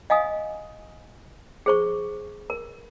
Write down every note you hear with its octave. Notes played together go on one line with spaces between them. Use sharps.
D#5 F5 G#5 D#6
G#4 C5 C#6
A#4